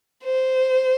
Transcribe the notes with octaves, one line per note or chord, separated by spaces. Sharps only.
C5